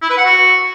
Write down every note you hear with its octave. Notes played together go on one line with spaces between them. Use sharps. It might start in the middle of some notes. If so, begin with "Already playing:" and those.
E4
B4
F#5
F#4